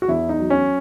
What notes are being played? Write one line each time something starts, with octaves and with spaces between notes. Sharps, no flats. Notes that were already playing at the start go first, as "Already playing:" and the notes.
F#4
E2 E4
D#4
F#3
C#4